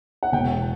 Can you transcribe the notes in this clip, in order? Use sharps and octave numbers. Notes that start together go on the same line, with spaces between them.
F#5
E1 G5